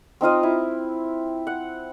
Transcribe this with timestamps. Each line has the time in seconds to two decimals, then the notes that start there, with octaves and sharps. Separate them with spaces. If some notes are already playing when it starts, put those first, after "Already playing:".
0.21 C4 D#4 F4 D#5
0.43 E4
1.47 F#5